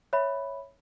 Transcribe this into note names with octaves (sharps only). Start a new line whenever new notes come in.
C#5 E5 B5